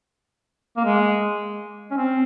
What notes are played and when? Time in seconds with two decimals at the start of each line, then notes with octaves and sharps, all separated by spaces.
0.77 A#3
0.85 G#3
1.91 C#4
1.97 C4